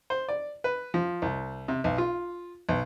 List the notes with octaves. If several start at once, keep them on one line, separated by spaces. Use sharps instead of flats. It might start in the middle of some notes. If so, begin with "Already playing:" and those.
C5
D5
B4
F3
C2
C3
B1
F4
B1